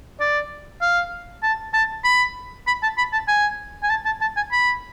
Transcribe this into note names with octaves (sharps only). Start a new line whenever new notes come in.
D5
F5
A5
A5
B5
B5
A5
B5
A5
G#5
G#5
A5
A5
A5
G#5
B5